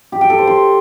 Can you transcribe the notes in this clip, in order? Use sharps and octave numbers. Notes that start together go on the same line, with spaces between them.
G4
G5
A4
C5
C6